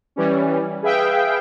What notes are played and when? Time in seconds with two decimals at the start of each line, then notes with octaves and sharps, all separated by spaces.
0.16 E3 G3 C#4
0.82 G#4 B4 E5 F5 G5